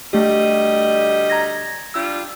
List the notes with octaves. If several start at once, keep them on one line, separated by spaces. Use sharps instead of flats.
D2 G3 A3 G4 D#5
A#5 G#6 A#6
G3 D4 F4 E6